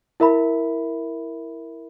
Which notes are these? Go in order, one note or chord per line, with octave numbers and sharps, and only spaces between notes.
E4 A#4 E5 B5